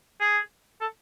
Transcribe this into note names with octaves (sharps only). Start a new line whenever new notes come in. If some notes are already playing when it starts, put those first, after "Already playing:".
G#4
A4